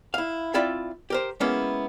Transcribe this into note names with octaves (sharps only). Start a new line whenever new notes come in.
E4 F5
C4 E4 F4 D5 E5 B5
G4 A#4 C5
G#3 A#3 B3 C#4 E4